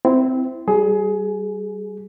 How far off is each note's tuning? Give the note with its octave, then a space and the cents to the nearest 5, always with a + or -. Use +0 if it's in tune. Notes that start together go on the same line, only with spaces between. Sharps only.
C4 -15 E4 +0
G3 -25 G#4 +20 G#5 +20